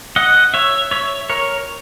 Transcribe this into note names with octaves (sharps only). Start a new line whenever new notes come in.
D#5 F#5
C#5 E5
C#5 E5
A#4 C#5